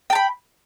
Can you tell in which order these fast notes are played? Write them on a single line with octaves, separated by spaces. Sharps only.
G5 A5 B5